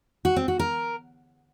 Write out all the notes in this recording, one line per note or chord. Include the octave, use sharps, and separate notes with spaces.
F#4
C4
F#4
A#4